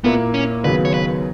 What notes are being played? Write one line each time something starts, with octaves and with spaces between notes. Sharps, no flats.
A#2 A#3 B3 E4
C#4
D#2 C#3 F#3 B3 B4
C#5
B4